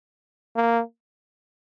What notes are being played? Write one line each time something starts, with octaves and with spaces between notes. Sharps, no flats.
A#3